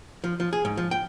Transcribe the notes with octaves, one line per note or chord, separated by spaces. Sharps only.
F3
F3
G#4
G#2
F3
G5